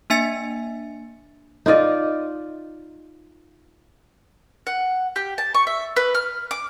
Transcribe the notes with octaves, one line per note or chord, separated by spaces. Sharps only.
A#3 D4 E5 G#5 A6 C#7
D#4 F4 D5 D#5
F#5
G4
A5
C#6
E5
B4
F6
D6